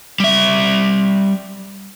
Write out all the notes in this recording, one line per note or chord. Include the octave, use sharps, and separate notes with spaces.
G3 E5